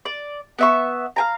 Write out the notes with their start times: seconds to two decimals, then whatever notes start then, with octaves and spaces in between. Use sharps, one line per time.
0.05 D5
0.59 B3 E5 C#6
1.16 F5 G#5 A#5